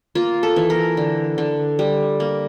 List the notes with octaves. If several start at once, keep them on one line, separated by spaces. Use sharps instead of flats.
A#3 F4
A4
E3
A#4
D3
D3
G3
A#3